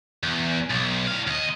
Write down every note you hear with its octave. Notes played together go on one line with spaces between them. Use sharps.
E2
B1
A2 F5
D#2 D#5